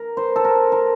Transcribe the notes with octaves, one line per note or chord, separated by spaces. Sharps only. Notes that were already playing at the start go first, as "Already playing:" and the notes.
Already playing: A#4
C5
A4
A#4
A#4